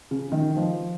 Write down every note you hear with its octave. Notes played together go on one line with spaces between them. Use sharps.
C#3
D#3
F3